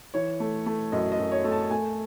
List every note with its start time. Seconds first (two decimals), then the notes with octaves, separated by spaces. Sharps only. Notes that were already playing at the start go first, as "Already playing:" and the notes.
0.14 E3 C#5
0.40 A3
0.66 A3
0.92 F#2 D#5
1.12 D#5
1.19 F#2
1.32 C#5
1.44 A3
1.51 A5
1.70 A3 G#5